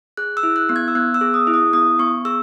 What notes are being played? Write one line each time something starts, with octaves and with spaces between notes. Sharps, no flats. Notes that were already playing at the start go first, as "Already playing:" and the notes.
G#4 F#6
E6
E4
F#6
B3
G#6
E6
B3 F#6
E6
G#4
D#6
E4
D#6
B3 D#6
B3 C#6
G#4 E6